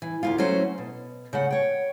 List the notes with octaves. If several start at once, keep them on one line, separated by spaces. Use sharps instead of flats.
E3
D2 G#2 F4
F#3 A3 C#4 E4 C5
B2
C#3 A3 F#5
C#5 G5